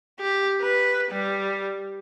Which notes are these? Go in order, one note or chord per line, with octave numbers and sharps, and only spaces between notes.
G4
B4
G3